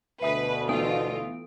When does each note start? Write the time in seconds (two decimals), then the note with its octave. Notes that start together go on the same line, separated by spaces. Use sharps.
0.22 D2 B2 B4 E5 D#6
0.69 E3 A3 B3 F4 D#6 D7